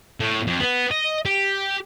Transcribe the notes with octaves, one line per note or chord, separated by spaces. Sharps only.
A2
F2
B3
D#5
G4